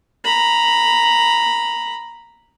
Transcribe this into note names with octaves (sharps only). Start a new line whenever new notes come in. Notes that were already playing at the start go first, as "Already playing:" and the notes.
A#5 B5